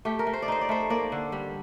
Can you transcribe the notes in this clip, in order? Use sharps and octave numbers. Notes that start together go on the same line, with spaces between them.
A3 G4
A#4
A3
C5
D5
D#4 C5
D5
A3 C5
A#3 D5
D3
G3